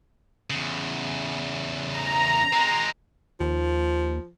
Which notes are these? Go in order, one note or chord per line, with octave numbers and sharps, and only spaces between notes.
E2 C#3
A#5
G#3 C4
D#2 F3